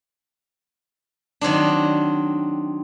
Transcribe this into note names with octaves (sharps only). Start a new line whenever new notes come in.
D#3 F#3 C4 D4